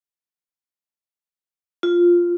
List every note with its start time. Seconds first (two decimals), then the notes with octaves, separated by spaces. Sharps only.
1.83 F4